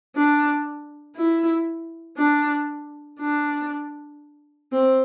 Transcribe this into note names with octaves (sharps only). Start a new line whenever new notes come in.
D4
E4
D4
D4
C4